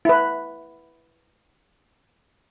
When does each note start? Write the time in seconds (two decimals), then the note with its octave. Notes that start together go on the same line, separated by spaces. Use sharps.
0.05 E4 B4